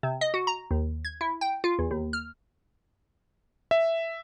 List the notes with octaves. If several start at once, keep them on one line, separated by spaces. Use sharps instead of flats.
C3
D#5
F#4
A#5
D#2
G#6
E4
G5
F4
E2
D#2
F6
E5